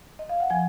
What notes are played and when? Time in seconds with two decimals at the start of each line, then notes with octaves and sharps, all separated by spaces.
0.19 D#5
0.29 F5
0.40 F#5
0.50 F3 G#5